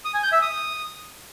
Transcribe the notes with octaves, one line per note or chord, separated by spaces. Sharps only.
D#6
G#5
G6
E5
D#6